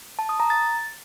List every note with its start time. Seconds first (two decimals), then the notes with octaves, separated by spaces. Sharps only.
0.19 A5
0.29 D#6
0.40 A#5
0.50 A6